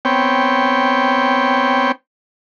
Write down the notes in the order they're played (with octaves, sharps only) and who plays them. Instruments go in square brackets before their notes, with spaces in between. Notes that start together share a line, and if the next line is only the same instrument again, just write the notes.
[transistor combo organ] B3 C4 C#5 G5